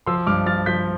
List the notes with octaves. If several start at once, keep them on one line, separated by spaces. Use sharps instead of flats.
F3 C6 E6
G2 D6 F6
F3 F6 A6
F3 G6 B6